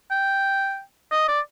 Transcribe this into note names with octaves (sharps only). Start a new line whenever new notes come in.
G5
D#5
D5